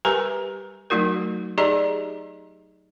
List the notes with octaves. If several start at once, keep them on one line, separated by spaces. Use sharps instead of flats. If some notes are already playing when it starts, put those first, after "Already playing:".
G3 G4 A#4 B4 G#5 A#5
F#3 A3 D#4 F#4 A#4
D#4 G4 G#4 D5 D#5 A#5